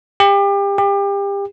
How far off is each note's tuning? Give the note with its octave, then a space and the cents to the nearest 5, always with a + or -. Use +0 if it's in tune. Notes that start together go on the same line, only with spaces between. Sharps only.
G4 +30
G4 +30